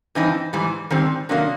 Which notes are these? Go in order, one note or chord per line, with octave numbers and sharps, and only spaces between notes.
G2 E3 C4 D#4
G#2 E3 G3
G#2 D#3 G3 C4
C3 D#3 F#3 A#3 D4